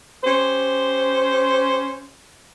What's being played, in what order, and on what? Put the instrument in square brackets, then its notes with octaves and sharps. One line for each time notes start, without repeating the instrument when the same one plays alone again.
[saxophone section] C#4 G4 C5